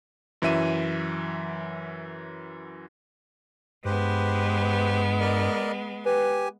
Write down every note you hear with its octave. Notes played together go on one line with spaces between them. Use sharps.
F#2 E3 F#3 E5 D#7
G2 G#3 B3 G4 B4 C5
A#4 D5 D#5
G4 B4 G#5